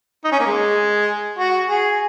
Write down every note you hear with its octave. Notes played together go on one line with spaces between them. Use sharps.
D#4
C#4
A#3
G#3
F#4
G#4